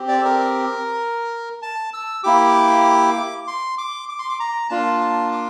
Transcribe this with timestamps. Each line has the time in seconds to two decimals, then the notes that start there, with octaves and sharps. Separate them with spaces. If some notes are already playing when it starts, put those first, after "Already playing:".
Already playing: C4 G4
0.08 D5
0.18 A4
0.24 A#4
1.62 A5
1.93 E6
2.24 A#3 E4 G4 D6
3.47 C6
3.78 D6
4.09 D6
4.19 C6
4.29 D6
4.40 A#5
4.70 A#3 D4 F4 A5
5.01 A5
5.32 D6